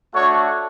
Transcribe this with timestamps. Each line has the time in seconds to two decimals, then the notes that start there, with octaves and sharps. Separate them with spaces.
0.14 A3 D4 F#4 C#5